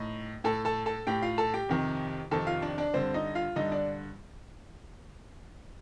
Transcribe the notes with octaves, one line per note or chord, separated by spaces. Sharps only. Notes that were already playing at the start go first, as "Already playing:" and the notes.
Already playing: A2 D#4
A2 A4 A5
A4 A5
A4 A5
A2 G4 G5
F4 F5
A4 A5
G4 G5
F2 C3 D#3
F2 C3 D#3 A4 A5
F4 F5
D4 D5
D4 D5
G2 D3 C4 C5
D#4 D#5
F4 F5
G2 D3 D#4 D#5
D4 D5